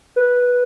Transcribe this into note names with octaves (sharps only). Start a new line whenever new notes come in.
B4